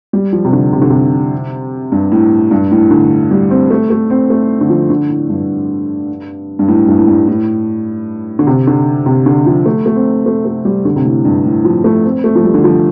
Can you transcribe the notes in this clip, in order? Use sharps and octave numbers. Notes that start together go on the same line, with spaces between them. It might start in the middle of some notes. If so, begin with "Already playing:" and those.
G3
F3
C3
D3
C3
D3
C3
G2
A2
G2
A2
D3
G3
C4
A3
A3
C4
A3
D3
F3
D3
A2
G2
G2
A2
G2
A2
G2
A2
D3
C3
D3
C3
D3
F3
A3
A3
C4
A3
A3
G3
D3
C3
A2
G2
A2
F3
A3
C4
A3
F3
G3
D3
F3